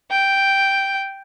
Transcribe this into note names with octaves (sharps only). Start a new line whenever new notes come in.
G5